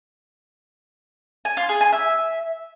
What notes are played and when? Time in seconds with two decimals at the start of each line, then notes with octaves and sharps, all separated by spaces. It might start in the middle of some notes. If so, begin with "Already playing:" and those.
1.45 G#5
1.57 F4
1.69 G#4
1.81 G#5
1.93 E5